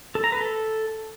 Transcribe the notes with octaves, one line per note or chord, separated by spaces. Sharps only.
A4
A#5
B4
A4